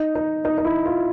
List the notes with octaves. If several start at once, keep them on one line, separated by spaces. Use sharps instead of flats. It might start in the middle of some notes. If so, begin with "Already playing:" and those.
Already playing: D#4
D#4
D#4
D#4
E4
F4